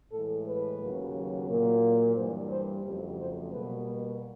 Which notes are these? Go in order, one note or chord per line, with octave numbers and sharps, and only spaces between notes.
A2 E3 G#3 A4
B4
D#2 C#3 F#3 A#3
A#2 F#3 A#3
G2 E3 G3 C5
C5
F2 C#3 F#3 A3 G4
C5
B2 G3 A#3 B4